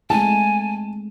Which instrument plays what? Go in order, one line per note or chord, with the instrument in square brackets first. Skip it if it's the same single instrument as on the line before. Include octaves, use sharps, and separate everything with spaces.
[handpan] G#3 A3 C4 [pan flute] G#5 [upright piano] A5